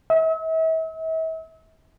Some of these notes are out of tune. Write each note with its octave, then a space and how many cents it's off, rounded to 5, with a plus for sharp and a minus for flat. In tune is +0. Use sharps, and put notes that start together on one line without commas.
E5 -40